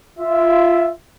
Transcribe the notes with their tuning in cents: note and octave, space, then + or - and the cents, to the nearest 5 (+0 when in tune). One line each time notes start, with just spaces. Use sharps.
F4 -15 E5 +0